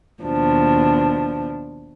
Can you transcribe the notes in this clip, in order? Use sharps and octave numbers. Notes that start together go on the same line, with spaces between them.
D#2 B2 F3 D4